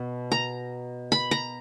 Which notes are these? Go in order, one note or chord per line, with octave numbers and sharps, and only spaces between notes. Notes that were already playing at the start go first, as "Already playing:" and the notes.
Already playing: B2
A#5
B5
A#5